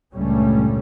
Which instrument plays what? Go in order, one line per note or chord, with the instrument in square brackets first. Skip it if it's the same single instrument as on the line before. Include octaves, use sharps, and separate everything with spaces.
[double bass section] C#2 G2 A#2 G3 A3 C#4